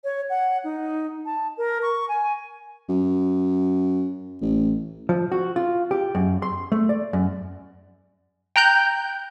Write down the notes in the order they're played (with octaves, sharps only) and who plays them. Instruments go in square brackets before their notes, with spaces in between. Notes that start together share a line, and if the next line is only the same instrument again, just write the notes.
[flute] C#5
F#5
D#4
A5
A#4
C#6
G#5
[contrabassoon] F#2
A1
[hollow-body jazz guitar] F3
F#4
F4
G4
F#2
C6
A3
D5
F#2
[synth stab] G5 A#5 F#6 G6